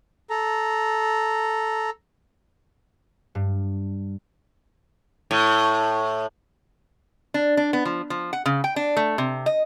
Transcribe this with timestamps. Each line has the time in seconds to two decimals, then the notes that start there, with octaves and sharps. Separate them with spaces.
0.30 A4 A#5
3.35 G2
5.31 A2
7.34 D4
7.57 D4
7.73 B3
7.85 F3
8.10 F3
8.33 F#5
8.46 C#3
8.64 G5
8.76 D4
8.97 A3
9.18 C3
9.46 D#5